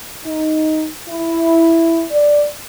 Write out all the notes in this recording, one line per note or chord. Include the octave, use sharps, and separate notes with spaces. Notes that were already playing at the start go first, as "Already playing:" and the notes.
D#4
E4
D5